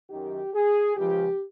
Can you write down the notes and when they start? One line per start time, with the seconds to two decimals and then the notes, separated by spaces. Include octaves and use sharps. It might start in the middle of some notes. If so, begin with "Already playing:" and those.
0.10 F#2 D#3 G4
0.54 G#4
0.96 C#2 C#3 F3 G4